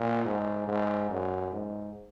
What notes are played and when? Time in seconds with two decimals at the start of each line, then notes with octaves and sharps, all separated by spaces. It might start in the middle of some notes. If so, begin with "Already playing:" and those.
Already playing: A#2
0.25 G#2
0.68 G#2
1.10 F#2
1.53 G#2